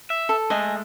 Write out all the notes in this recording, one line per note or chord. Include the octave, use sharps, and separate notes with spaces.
E5
A4
G#3 A3 D#5 G#5